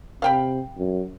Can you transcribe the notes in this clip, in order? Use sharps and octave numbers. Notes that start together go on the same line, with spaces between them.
C3 F5 G5 B5
F#2